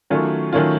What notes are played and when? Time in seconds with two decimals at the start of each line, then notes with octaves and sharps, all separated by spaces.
0.10 D#3 F#3 A3 C#4 F4
0.53 D#3 F#3 A3 C#4 F4